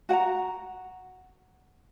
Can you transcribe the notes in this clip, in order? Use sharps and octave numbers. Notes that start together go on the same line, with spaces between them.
F#4 F#5 G5 A#5